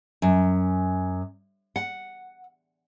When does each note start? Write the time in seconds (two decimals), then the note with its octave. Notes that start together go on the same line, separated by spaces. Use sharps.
0.22 F#2
1.76 F#5